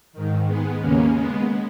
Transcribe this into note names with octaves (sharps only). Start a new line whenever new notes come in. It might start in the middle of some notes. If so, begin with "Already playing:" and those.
G#2 D#3
G#3 B3
D#2 C#3 A#3 C#4
G#3 B3